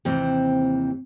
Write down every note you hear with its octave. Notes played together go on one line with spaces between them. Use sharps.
D#2 C3 E3 C4